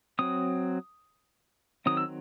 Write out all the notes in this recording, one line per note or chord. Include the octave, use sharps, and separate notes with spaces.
F#3 C4 D#6
D#3 F#3 C4 D#6
E6